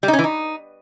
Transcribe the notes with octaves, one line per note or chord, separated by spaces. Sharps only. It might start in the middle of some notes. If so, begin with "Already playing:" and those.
G3
D#4
C#4
E3
D#4